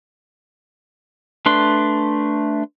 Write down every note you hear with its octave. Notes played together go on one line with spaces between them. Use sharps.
A3 D4 B4 C6